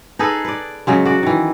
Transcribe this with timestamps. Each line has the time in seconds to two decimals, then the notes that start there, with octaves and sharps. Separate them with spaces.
0.19 D#4 G#4 A4 B4
0.45 B4 D5
0.87 C#3 F#3 G#3
1.05 F#4 D5
1.23 D#3 E3